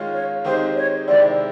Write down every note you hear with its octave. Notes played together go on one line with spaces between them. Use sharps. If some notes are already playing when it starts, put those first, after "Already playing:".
Already playing: D#3 G#3 C#4 F4
C#5
D#3 G#3 C4 D#4 G4 C5
C#5
C3 D#3 G#3 C4 E4 D5